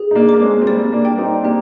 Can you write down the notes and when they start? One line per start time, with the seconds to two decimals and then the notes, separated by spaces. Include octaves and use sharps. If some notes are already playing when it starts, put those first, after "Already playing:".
Already playing: G#4
0.11 D#4
0.15 A#3 D4
0.29 A#3 D6
0.41 G#3 C4
0.62 C4
0.67 G3 A#3 D5
0.92 A#3 D4
1.05 D4 G5
1.18 C4 D#4
1.43 A#3 D4 G4